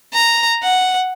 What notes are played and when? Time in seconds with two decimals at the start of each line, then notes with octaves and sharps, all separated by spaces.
0.14 A#5
0.63 F#5